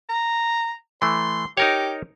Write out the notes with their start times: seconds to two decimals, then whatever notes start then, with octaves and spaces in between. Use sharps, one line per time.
0.09 A#5
1.02 E3 A3 C6
1.57 D#4 G4 A#4 C#5